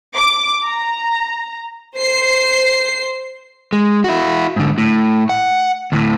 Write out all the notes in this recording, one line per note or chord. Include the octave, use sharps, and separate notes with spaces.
D6
A#5
C5 C7
G#3
E4 F#4
G#2 D3
A2
F#5
D2 A2